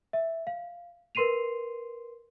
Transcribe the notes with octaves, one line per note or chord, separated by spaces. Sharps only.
E5
F5
A#4 B4 C6 C7 D#7 F7